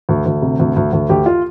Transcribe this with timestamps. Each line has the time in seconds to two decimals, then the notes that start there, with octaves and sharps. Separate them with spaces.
0.09 D2
0.26 D2
0.42 C3
0.59 D2
0.76 D2
0.93 D2
1.09 D2 G4
1.26 F4